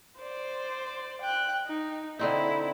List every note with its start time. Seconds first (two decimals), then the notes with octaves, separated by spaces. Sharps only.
0.19 C5 D5
1.21 G5 F#6
1.67 D#4
2.19 D3 C4 D#4 E4